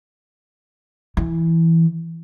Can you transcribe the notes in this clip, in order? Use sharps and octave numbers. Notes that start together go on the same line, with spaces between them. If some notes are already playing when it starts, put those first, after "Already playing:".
E3